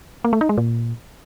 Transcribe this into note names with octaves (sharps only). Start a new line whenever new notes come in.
A#3
A3
D#4
G#3
A#2